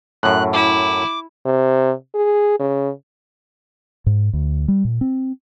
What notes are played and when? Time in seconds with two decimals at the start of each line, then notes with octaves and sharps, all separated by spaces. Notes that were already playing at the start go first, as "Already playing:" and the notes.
0.23 F#2 A2 F#6
0.53 E4 D6
1.46 C3
2.15 G#4
2.60 C#3
4.06 G#2
4.33 D2
4.68 G3
4.85 A#2
5.01 C4